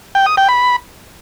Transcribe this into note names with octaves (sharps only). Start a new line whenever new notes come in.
G5
D#6
G5
B5